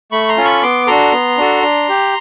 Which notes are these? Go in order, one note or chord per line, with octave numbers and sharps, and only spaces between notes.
A3 B5 C#6
A#5 C6
C#4 F4 A4
B5 C#6
B3 C6 D6
D4 F#4 A4 A#5 C6
B3
D4 F#4 A4
D4
G4